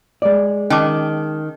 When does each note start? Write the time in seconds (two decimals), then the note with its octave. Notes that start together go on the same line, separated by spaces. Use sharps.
0.22 G#3 D5
0.70 D#3 C#4 A5 D6